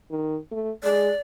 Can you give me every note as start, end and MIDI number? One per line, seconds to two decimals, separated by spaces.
0.11 0.37 51
0.51 0.71 57
0.83 1.10 56
0.83 1.19 74